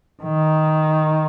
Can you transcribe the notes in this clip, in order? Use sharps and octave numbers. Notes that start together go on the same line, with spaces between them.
D#3